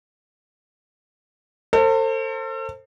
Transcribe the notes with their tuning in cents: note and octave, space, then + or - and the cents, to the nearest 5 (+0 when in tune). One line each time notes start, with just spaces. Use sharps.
A4 +40 C5 +25